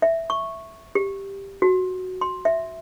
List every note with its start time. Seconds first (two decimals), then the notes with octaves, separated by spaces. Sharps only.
0.02 E5
0.30 C#6
0.95 G4
1.62 F#4
2.21 C6
2.45 E5